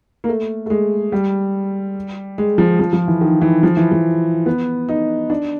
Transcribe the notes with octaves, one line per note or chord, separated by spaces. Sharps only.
A#3
A3
A3
G#3
G3
G#3
F3
F3
F3
E3
D#3
E3
F3
E3
F3
B3
D#4
D4